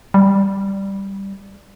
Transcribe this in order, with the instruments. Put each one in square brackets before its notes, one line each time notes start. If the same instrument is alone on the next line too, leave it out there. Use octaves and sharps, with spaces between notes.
[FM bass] G3